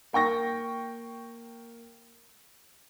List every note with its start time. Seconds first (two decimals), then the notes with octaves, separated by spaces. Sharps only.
0.13 A#3 G5 C#6 A#6